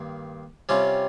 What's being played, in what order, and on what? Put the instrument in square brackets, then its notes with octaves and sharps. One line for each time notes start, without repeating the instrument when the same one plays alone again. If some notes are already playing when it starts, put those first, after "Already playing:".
Already playing: [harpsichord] G2 D#3 A#3
C3 G3 C#4 F4